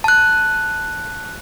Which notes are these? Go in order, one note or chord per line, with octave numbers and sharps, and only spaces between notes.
A5 F#6